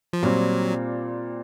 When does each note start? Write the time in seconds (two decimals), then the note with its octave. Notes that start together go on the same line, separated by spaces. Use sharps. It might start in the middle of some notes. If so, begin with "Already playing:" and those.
0.13 F3
0.23 A#2 F#3 G3 C4